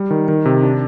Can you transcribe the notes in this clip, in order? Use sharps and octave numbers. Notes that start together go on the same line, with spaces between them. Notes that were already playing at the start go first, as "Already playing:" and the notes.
Already playing: G3
D#3
D#3
C3
D4